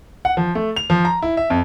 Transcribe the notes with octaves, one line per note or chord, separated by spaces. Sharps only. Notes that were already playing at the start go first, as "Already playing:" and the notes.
F#5
F3
A3
F7
F3
A#5
E4
E5
F2